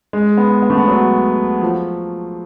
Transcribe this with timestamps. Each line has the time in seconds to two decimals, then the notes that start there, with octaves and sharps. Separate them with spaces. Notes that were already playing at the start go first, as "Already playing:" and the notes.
0.13 G#3
0.38 B3
0.63 B3
0.70 A3
0.78 B3
0.88 F#3
1.62 F3